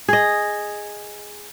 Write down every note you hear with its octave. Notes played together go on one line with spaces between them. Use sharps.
G#4 D#5